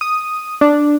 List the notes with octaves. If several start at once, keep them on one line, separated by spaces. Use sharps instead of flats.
D#6
D4